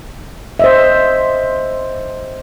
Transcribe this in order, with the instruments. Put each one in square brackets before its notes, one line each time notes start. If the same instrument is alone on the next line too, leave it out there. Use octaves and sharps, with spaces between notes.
[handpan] C5 D#5 E5